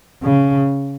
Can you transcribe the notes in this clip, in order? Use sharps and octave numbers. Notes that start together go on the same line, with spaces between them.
C#3